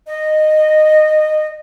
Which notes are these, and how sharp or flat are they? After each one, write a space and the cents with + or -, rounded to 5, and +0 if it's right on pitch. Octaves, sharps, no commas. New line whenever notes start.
D#5 -15